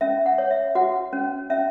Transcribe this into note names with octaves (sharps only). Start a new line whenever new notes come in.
C#4 E5
F#5
C#5
E5
F#4 F#5
C#4
C#4 E5